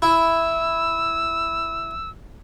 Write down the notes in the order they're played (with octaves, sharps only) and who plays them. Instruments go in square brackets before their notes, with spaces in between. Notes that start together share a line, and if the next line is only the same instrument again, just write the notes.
[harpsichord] E4 [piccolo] E6